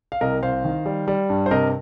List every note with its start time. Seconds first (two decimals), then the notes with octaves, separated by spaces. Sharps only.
0.12 F5
0.21 C2 A#4 D#5
0.42 C2 C5 F5
0.65 D#3
0.86 G3
1.08 G3
1.30 G2
1.46 C5
1.51 C3 A#4 D#5